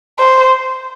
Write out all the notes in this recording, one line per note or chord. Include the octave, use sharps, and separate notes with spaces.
C5